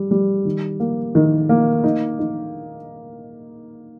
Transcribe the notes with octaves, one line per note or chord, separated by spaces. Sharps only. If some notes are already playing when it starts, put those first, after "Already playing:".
Already playing: G3
G3
D#3
A#3
D#3
A#3
D#4
D#4